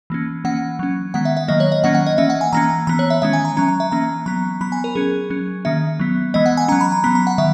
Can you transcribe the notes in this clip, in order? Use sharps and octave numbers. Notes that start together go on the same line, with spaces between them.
E3 A#3 C#4
E3 A#3 C#4 F#5
F#3 C#4
D#3 G#3 B3 F#5
E5
E5
D#3 F#3 A#3 D#5
C#5
D#5
D#3 F#3 A#3 C#4 F#5
F#5
D#5
E3 A#3 C#4 E5
F#5
G#5
E3 A#3 C#4 A#5
E3 B3 A#5
C#5
E5
D#3 G#3 C#4 E5
G#5
A#5
F#3 C#4 A#5
A#5
E5
E3 A#3 C#4 A#5
F#3 B3 A#5
F#3 B3 B5
G#5
A#4
F#3 C#4 G#4
F#3 C#4
D#3 A#3 C#4 E5
F#3 B3
E3 G#3 B3 D#5
F#5
G#5
F#3 C#4 A#5
B5
A#5
F#3 B3 B5
A#5
F#5
D#3 F#3 E5